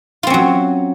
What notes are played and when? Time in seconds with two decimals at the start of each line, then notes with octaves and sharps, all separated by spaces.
0.23 F4
0.27 C4
0.30 C#4
0.34 F#3